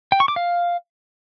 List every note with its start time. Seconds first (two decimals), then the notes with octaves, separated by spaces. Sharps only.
0.12 G5
0.20 C#6
0.28 D6
0.36 F5